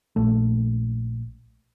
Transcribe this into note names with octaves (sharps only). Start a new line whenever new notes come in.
A#1 A3